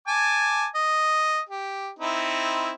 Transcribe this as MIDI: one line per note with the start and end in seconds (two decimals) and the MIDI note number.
0.08 0.66 80
0.08 0.66 81
0.08 0.66 86
0.75 1.40 75
1.49 1.89 67
1.99 2.71 60
1.99 2.71 63
1.99 2.71 64